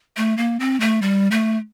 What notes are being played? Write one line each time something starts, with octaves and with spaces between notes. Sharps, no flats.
A3
A#3
C4
A3
G3
A3